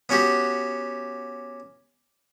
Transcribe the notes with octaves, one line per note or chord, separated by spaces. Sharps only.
B3 C#4 F#4 G4